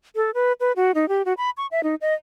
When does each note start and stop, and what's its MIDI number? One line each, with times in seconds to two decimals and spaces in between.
0.16 0.31 69
0.34 0.53 71
0.60 0.72 71
0.76 0.92 66
0.95 1.08 63
1.09 1.22 67
1.25 1.33 66
1.37 1.50 83
1.57 1.67 85
1.71 1.83 76
1.83 1.95 63
2.01 2.14 75